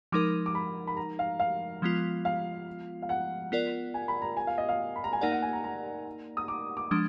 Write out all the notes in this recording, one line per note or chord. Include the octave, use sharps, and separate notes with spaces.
F3 G#3 D#4 A#4 D6
D6
B5
B5
A#5
F5
F5
F3 G#3 B3 F4
F5
F5
F#5
B3 F4 A#4 D5
G#5
B5
A#5
G#5
F5
D#5
F5
B5
A#5
G#5
A#3 D#4 A#4 D5 F#5
F#5
G#5
A#5
A#5
D#6
D6
D6
F3 G#3 D4 D#6